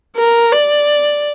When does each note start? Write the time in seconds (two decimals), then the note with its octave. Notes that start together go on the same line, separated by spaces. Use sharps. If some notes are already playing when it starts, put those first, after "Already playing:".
0.17 A#4
0.52 D5